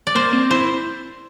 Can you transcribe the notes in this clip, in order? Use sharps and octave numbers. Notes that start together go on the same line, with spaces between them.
D5
A#3 C5
C4
E4 C5